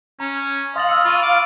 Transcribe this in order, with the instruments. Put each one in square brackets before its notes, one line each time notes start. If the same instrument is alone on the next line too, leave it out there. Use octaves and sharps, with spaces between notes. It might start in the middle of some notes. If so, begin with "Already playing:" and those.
[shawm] C#4 [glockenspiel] A#5
[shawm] D#5 [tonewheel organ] F5 [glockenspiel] C6 A6 F#7
[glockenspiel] E6 C#7
[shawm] F4 [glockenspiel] B5 C#6 D#7
[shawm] D6